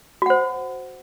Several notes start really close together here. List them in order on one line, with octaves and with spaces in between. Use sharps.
F#4 F#5 C5